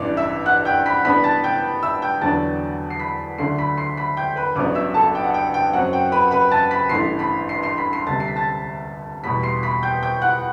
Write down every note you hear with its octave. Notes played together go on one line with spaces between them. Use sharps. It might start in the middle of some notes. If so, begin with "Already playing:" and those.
Already playing: A1 G2 E3 D5 D6
E5 E6
F#5 F#6
G5 G6
B5 B6
G2 E3 B3 D4 B5 B6
A5 A6
G5 G6
E5 E6
G5 G6
E2 D3 F#3 B3 D4 A5 A6
C7
B5 B6
D2 D3 F#3 A3 D4 C6 C7
B5 B6
C6 C7
B5 B6
G5 G6
B4 B5
A1 G2 F#3 B3 D5 D6
E5 E6
A4 A5
G5
F#5
G5
G5
F#2 F#3 C4 F#5
G5
B4 B5
B4 B5
A5 A6
B5 B6
A1 G2 E3 A3 C6 C7
B5 B6
C6 C7
C6 C7
B5 B6
C6 C7
D2 C3 G3 A5 A6
C7
B6
A5 A6
E2 B2 G3 B5 B6
C6 C7
B5 B6
G5 G6
G5 G6
F#5 F#6